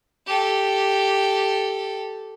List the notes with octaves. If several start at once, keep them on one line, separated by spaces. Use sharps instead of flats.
G4 A4